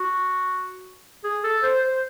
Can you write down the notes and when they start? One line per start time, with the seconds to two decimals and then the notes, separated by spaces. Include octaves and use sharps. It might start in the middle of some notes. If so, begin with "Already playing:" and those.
Already playing: F#4
1.24 G#4
1.44 A4
1.63 C5
1.84 C5